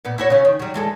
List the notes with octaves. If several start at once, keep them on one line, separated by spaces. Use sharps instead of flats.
A#2 B3
E4 F#4 C#5
C#3 C#4
D#3
F#3 G3
E3 G#3 A4